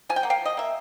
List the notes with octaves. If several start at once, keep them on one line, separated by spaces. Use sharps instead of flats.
F3 G#5
G5
A#3 F#5
F5 G5
F3 D#5
A#3 E5